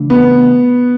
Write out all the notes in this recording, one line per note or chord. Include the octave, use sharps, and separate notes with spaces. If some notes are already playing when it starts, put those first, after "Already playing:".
Already playing: C#3 E3 A3 D4
B3